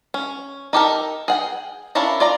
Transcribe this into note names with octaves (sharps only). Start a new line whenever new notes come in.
C#4
D#4 G4 A4 A#4
G#4 F#5 G5
C#4 D4 E4 A#4 F5
F4 D5 A#5